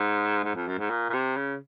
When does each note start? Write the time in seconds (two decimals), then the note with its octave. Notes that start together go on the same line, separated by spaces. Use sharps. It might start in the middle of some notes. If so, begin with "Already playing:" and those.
Already playing: G#2
0.43 G#2
0.54 F2
0.67 F#2
0.78 G#2
0.90 A#2
1.10 A#2
1.13 C3
1.36 C#3